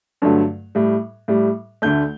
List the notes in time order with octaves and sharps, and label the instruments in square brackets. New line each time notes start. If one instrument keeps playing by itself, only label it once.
[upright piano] G2 D3 F#3 A3
A2 G3
A2 G3
D2 D3 A3 G6